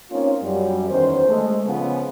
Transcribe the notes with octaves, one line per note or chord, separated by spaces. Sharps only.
A#3 C4 C#4 D#4 F4 C#5
F#2 G3
E2 D#3 C#4 C5
G#3 A3
C#3 F3 B3